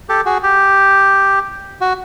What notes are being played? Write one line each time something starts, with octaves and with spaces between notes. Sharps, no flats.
G4 A4
F#4 G#4
G4
F#4